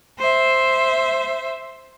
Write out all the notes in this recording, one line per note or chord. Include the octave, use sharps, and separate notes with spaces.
C5 E5